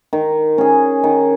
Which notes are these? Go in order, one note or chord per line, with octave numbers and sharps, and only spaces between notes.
D#3
C#4 G#4
D#3